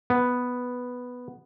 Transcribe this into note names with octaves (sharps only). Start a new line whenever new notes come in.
B3